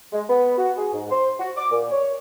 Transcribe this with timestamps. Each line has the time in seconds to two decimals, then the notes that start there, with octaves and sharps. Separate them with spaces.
0.13 G#3
0.29 B3
0.58 F#4
0.78 G#4
0.94 G#2
1.11 C5
1.40 F#4
1.57 D6
1.71 A#2
1.92 C#5